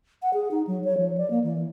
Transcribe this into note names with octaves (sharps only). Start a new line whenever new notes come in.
F#5
G#4
D#4
F#3
C#5
F3
D5
A#3
E3